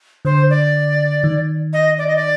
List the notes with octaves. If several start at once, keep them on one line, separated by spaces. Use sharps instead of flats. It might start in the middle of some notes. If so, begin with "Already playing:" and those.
D3 C5
D5
D#3
D#5
D5
D#5
D5